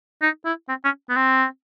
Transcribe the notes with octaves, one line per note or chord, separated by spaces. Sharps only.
D#4
E4
C4
C#4
B3
C4